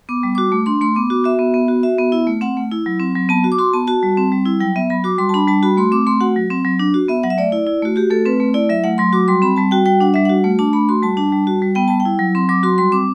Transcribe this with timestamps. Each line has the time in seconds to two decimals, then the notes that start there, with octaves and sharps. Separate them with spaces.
0.09 B3 D6
0.23 G3
0.35 F#4 D6
0.52 A3
0.66 D4 C6
0.81 A3 C6
0.95 B3 D6
1.10 F#4 D6
1.24 F#4 E5
1.39 B3
1.54 B3
1.68 F#4
1.83 F#4 E5
1.98 B3
2.12 E4
2.27 A3
2.41 C4 F#5
2.57 A3
2.71 E4
2.86 F#3
3.00 C4
3.15 F#3
3.29 B3 A5
3.44 F#4
3.52 D6
3.59 F#4 C6
3.73 B3 A5
3.87 F#4 A5
4.03 G3
4.17 C4
4.32 G3
4.46 E4
4.60 F#3 G5
4.76 B3 E5
4.90 F#3 B5
5.04 F#4 D6
5.18 G3 C6
5.29 A5
5.34 D4 B5
5.48 G3 A5
5.63 F#4 B5
5.77 A3 C6
5.92 C4 D6
6.07 A3 C6
6.21 F#4 F#5
6.36 F#3
6.50 C4
6.65 F#3
6.79 D4
6.94 F#4
7.09 B3 E5
7.23 F#3 F#5
7.30 E5
7.38 A3 D5
7.52 E4
7.67 E4
7.82 A3 F#4
7.96 F#4 G4
8.10 A3 A4
8.25 C4 B4
8.40 A3
8.54 E4 D5
8.70 F#3 E5
8.84 A3 F#5
8.98 F#3 C6
9.13 F#4 D6
9.28 G3 C6
9.42 C4 B5
9.56 G3 A5
9.71 F#4 G5
9.86 G3 G5
10.00 D4 F#5
10.14 G3 E5
10.25 F#4 F#5
10.44 A3
10.59 D4 A5
10.73 A3 B5
10.89 F#4 C6
11.03 G3 A5
11.17 D4 A5
11.32 G3
11.47 F#4
11.62 G3
11.75 B3 G5
11.88 G3 A5
12.00 G5
12.05 E4
12.19 F#3
12.35 C4 C6
12.49 F#3 D6
12.63 F#4 C6
12.78 G3 C6
12.92 C4 D6